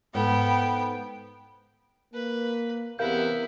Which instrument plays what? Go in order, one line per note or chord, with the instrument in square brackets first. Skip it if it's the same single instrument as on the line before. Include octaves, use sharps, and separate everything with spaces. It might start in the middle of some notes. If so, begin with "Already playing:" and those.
[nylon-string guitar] G#2 A4 [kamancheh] B3 G5
[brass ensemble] A#3 [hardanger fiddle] B4
[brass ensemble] E2 C3 [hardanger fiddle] B3 E4 [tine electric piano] A#4 F5 G6